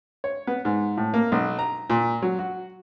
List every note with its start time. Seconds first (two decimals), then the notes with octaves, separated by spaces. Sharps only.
0.24 C#5
0.47 B3
0.65 G#2
0.97 A2
1.14 A#3
1.32 B1
1.59 A#5
1.90 A#2
2.22 F#3
2.39 F#4